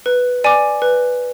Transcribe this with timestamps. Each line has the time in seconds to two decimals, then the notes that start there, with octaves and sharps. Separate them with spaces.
0.06 B4
0.44 D5 G#5 D6
0.82 B4